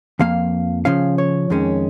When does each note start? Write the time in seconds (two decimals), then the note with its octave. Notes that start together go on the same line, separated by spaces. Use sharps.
0.19 F2 F3 A#3 F5
0.85 C#3 F3 C#4 F5
1.18 C#5
1.50 F2 D#3 G#3 C#4